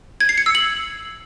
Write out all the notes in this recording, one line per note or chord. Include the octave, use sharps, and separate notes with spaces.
G#6
C7
C#7
E6
F#7